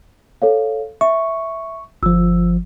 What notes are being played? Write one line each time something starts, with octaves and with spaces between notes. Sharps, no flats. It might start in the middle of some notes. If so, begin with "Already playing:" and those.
A4 C#5 F5
E5 C#6
G1 F3 E6